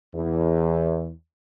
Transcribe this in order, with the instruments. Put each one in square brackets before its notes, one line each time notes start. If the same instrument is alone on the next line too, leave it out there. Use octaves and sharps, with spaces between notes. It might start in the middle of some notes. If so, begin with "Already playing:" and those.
[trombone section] E2